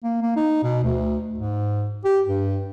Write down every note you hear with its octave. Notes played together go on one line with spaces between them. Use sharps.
A#3
A#3
D#4
B2
D2
G#2
G4
G2